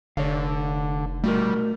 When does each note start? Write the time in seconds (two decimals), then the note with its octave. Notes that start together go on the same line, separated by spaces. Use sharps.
0.17 F1 D3 C#5 D5 F5
1.24 G3 A3 F#4 A#4